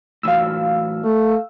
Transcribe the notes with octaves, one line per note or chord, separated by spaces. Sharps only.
A2 E3 F#3 F5 E6
A3